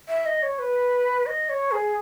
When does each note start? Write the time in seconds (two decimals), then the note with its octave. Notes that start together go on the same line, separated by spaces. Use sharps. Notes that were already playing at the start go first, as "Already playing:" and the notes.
0.08 E5
0.26 D#5
0.43 C#5
0.59 B4
1.26 D#5
1.49 C#5
1.72 G#4